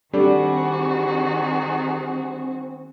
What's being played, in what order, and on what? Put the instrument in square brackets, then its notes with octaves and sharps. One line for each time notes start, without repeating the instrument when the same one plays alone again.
[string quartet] D#3 F#4 G#4 [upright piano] G3 D4 A4 [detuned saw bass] C4